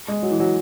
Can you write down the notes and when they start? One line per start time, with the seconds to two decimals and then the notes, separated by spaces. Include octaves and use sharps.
0.08 G#3
0.23 F#3
0.31 E3
0.39 F#3